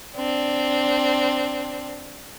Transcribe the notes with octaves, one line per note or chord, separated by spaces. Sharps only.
C4 D4